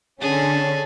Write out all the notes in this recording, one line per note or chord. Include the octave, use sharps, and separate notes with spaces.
D3 C#4 G#4 A4